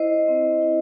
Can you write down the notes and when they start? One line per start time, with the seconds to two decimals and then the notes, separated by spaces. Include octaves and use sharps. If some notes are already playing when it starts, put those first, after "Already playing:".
Already playing: E4 C5 D#5
0.28 C4
0.62 E4